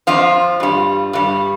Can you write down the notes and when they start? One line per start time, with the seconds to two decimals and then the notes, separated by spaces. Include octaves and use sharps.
0.07 F2 F3 F4
0.60 G2 G3
1.13 G2 G3